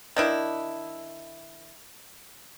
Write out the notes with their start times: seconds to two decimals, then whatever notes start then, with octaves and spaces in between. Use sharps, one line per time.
0.16 D#3 D4 E4